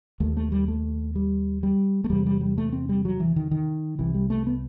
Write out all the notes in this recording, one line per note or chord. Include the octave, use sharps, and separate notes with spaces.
D#2 A3
A3
G3
A3
G3
G3
A3
E2 C3 G3
G3
G3
A3
C4
G3
F#3
E3
D#3
D#3
C2 C3 E3
G3
A3
B3